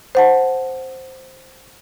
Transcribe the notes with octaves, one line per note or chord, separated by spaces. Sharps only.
C5 F#5 A5